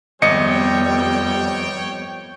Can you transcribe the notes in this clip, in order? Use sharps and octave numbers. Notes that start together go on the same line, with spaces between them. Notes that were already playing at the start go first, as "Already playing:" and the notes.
G#1 F2 G3 B3 C#5 D#5 G5 C#7